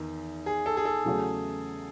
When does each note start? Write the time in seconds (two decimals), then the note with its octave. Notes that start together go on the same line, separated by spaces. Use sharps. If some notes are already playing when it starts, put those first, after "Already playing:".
Already playing: E2 D#3 D#4
0.46 G#4
0.66 A4
0.77 G#4
0.85 A4
1.05 E2 C#3 F#3 A3 C#4